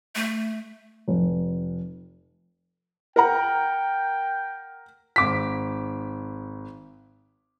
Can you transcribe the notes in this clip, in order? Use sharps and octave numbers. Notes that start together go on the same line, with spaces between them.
A3
F1
A#4 F#5 G5 A#5
G#1 D6 B6